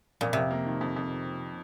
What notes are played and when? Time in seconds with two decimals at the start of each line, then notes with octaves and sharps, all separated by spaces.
0.21 F2 A#2
0.33 F2 C3
0.51 A#3
0.66 D#3
0.81 F2
0.96 F2